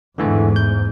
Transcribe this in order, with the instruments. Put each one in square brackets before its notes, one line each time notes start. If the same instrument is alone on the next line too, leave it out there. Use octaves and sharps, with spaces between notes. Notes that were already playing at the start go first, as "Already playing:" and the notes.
[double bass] E2 G#2 [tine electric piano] D3 E3 A3
[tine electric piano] G6